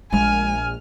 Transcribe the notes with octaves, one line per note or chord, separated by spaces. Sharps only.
A#1 G#3 G#5 F6